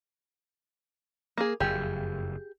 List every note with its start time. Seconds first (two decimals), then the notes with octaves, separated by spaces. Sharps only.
1.38 A#3 G#4
1.60 F#1 F2 G4 G#4